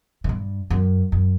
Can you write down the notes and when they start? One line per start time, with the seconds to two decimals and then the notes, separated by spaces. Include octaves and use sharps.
0.24 A#2
0.29 G2
0.70 F#2
1.12 F#2